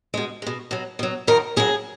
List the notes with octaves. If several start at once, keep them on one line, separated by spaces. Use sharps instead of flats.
B2 G#3
B2 G#3
B2 F#3
B2 F#3
F2 D#3 F#3 A#4
F2 D#3 F#3 G#4